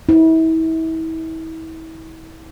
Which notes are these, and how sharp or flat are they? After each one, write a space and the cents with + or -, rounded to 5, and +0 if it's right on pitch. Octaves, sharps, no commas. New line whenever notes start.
E4 -35